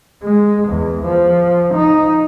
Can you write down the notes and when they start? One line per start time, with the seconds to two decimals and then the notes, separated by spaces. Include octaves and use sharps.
0.23 G#3
0.69 E2
1.05 F3
1.74 D#4